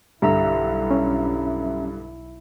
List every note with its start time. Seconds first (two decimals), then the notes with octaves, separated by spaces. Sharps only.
0.22 B1 G2 D3 E4 G4 E5 A#5
0.91 C#4